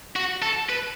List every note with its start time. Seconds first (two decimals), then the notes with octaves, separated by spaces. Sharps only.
0.16 F#4
0.42 A4
0.69 B4